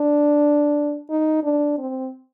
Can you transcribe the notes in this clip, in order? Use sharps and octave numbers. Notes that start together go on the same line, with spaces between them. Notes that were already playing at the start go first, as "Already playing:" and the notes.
Already playing: D4
D#4
D4
C4